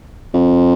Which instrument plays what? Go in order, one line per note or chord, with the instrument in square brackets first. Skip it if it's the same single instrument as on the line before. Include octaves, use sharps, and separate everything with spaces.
[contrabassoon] F2